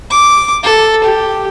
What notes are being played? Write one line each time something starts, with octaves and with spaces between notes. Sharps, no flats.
D6
A4
G4